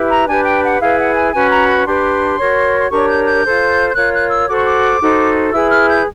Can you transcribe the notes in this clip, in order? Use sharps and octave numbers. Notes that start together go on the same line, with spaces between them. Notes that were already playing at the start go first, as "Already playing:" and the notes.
Already playing: E4 G4 B4
A#5
D4 G4 B4 G#5
G5
F#5
E4 G#4 B4 F5
F#5
G#5
C#4 F#4 B4 G#5
A#5
B5
D4 G4 B4 C6
F#4 A#4 C#5
C6
D4 G4 A#4 C#5 C#6
G6
G6
F4 A4 C5
G6
F4 A#4 C#5 F#6
F#6
E6
F#4 A4 C5 D6
C#6
D6
D#4 F#4 A4 C5
E4 G#4 B4 E6
F6
G6